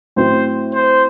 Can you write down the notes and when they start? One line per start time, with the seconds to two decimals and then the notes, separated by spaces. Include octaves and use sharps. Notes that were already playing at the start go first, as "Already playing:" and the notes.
0.16 A2 F#3 C4 C5
0.74 C5